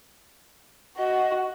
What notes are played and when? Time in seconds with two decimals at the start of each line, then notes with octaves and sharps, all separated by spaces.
0.97 F#4 D#5